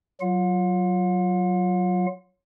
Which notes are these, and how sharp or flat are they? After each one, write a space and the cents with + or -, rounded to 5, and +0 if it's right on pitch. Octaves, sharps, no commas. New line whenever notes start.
F#3 +0 F4 +0 F#5 -45